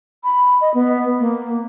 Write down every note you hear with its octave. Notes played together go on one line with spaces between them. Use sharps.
B5
D#5
B3
A#3